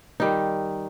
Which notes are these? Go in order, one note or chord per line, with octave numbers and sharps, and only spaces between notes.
D#3 G3 D#4